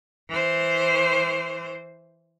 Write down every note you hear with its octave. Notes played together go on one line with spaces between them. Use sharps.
E3 C5